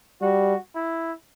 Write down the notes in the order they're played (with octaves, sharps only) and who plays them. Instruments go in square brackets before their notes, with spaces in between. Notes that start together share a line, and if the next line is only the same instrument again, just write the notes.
[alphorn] G3 [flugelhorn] F#4
[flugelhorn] E4